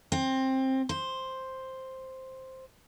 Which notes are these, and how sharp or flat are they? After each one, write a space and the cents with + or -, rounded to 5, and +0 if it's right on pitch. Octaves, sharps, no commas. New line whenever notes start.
C4 +15
C5 +0